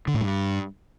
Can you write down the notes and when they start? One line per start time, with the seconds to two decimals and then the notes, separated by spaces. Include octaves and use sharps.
0.07 D3
0.14 A2
0.21 G2